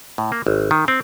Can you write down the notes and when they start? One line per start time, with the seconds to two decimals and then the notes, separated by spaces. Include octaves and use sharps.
0.18 A2
0.32 A#3
0.47 G#1
0.71 D#3
0.88 C4